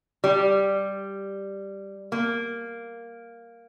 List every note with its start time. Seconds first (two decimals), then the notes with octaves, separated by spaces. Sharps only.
0.24 G3
2.12 A#3